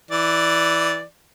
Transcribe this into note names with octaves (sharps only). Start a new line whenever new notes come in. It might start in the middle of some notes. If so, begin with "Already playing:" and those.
E3 D5